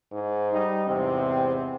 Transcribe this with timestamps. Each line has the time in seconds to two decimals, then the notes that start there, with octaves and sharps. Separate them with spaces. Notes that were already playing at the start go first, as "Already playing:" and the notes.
0.12 G#2
0.53 G3 D#4
0.88 E2 G#2 C3 C4